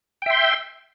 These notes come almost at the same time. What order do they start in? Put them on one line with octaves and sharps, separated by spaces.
G5 E5 C6